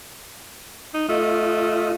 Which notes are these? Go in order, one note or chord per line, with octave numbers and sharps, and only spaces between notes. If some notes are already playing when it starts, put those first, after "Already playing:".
D#4
A3 F4 D#5